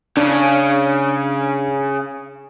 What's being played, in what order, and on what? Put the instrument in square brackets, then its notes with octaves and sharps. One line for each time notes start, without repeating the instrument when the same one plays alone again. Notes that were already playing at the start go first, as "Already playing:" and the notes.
[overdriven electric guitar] C#3 [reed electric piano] D4